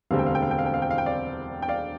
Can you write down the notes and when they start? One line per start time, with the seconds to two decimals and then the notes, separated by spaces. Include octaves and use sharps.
0.11 E1 D2 D3 G3 C4 F5
0.19 G5
0.26 F5
0.35 G5
0.42 F5
0.51 G5
0.58 F5
0.66 G5
0.74 F5
0.82 G5
0.91 F5
0.98 G5
1.06 D5 F5
1.62 G5
1.68 D5 F5